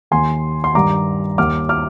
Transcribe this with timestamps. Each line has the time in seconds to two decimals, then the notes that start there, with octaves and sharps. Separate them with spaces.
0.11 D#2 D#3 G#5 C6
0.64 C6
0.75 G2 D#3 A#5 D6
1.38 D#2 D#3 D6 F6
1.69 D6 F6